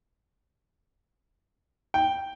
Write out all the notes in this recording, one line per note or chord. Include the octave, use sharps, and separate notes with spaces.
G5